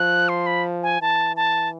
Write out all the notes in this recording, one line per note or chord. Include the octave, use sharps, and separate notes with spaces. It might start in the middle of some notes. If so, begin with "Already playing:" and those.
Already playing: F3 F#6
C6
B5
G#5
E3 A5
A5